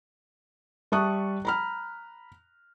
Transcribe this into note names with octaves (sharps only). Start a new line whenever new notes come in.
G3 E5 A5 C#6 D#6 F#6
A#5 B5 F6